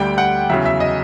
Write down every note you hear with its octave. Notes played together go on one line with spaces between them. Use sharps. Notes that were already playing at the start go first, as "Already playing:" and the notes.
Already playing: D2 D3 G3 G5
F#5
E2 C#3 F#3 E5
E5
D#5